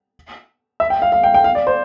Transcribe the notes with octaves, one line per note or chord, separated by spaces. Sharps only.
E5
G5
F5
F5
G5
G5
F5
D5
C5